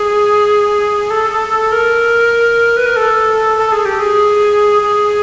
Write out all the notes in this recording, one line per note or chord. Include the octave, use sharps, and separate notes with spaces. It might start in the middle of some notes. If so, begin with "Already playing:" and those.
Already playing: G#4
A4
A#4
B4
A#4
A4
A4
G#4
G4
G#4
G#4